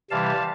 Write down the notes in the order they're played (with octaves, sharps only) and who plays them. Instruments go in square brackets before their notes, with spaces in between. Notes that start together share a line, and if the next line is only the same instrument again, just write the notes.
[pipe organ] C3 E3 G3 F5 A5